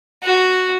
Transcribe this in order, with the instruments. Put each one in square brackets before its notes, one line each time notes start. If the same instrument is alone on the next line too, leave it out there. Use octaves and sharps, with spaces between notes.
[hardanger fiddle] F#4